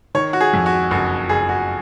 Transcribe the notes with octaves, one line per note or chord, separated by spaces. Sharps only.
D#3 C#5
F#4
G#4
F2
F#4
F#1 F#4
F#1 G#4
F#4